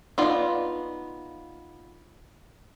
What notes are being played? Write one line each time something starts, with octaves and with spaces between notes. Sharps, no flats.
B3 D#4 F4 D5